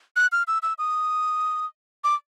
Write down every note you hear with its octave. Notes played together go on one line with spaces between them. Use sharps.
F#6
F6
E6
E6
D#6
D6